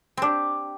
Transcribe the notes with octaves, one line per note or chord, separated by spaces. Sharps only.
C4 D4 G4